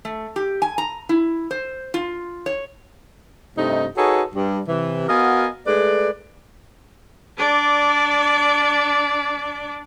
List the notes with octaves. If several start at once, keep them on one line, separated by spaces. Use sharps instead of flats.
A3
G4
G#5
A#5
E4
C5
F4
C#5
G2 C3 A3 D#4
D#4 F#4 G#4 A4 B4 C#5
G2
C3 E3
B3 F#4 A#4 D#5 F5 G#5
G#3 A3 B4 D5
D4 D5